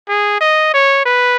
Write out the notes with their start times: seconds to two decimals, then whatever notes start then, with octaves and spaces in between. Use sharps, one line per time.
0.09 G#4
0.41 D#5
0.74 C#5
1.06 B4